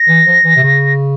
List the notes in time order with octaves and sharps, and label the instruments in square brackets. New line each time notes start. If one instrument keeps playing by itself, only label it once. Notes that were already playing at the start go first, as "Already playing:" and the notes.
Already playing: [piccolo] A#6
[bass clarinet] E3
F3
E3
C3
C#3